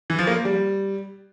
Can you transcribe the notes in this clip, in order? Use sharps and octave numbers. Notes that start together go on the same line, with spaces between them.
E3
F3
A#3
F3
G3